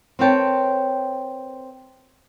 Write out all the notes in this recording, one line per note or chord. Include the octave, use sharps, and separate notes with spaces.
C4 A#4 B4 C#5 G5 A5